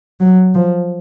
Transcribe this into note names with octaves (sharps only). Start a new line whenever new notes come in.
F#3
F3